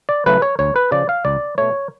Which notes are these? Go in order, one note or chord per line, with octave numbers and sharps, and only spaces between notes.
D5
C#3 F#3 A3 B4
C#5
D2 C#5
B4
C#3 F3 D5
F5
C#2 D5
B2 A3 C#5